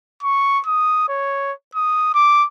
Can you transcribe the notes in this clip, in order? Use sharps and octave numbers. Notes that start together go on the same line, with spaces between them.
C#6
D#6
C#5
D#6
D6